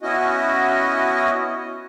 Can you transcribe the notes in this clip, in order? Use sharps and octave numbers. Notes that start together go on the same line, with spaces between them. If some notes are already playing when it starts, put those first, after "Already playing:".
B3 C#4 E4 F#4 D#5